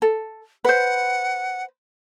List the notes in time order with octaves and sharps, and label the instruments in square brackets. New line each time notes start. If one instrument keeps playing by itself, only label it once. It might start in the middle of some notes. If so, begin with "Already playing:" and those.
[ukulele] A4
[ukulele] B4 C5 [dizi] F#5